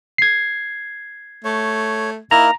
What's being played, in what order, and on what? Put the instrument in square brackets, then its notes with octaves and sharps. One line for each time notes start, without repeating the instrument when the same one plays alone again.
[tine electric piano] G#6 C7
[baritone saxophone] A3 [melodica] C#5
[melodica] A#3 D#4 A#4 [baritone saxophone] E4 [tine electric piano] A#5